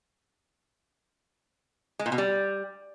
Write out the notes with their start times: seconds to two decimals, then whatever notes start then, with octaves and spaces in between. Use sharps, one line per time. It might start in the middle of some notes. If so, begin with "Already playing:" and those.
1.99 G#3
2.06 A#2
2.12 B2
2.18 G3